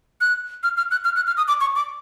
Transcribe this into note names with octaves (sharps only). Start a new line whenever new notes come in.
F#6
F6
F6
F#6
F6
F#6
F6
D#6
D6
C#6
D6